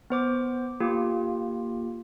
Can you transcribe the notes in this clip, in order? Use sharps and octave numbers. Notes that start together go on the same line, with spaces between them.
B3 C5 D6
A#3 F4 G4